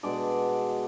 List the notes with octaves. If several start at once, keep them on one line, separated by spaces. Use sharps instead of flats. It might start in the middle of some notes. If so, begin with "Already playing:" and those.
B2 G#3 D4 D5